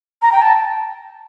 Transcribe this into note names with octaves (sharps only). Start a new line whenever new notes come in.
A#5
G5
A5